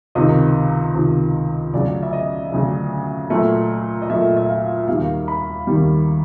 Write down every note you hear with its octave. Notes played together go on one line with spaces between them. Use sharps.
C#2 C3 D#3 D#5
C#2 C3 D#3
D2 C#3 F#3 D5
E5
D#5
D2 C#3 F#3
A#2 F#3 A3
D#5
A#2 F#3 A3 E5
E5
F5
D#2 D#3 G3 F5
B5
D#2 D#3 G3